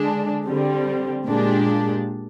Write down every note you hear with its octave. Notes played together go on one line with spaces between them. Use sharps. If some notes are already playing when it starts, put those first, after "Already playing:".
Already playing: D3 G#3 D4
D3 G3 C4
A#2 G#3 D4 G4